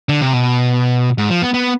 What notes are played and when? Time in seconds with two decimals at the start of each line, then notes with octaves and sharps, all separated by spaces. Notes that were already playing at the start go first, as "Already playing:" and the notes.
0.09 D3
0.21 C3
0.33 B2
1.18 G#2
1.30 F3
1.42 B3
1.54 B3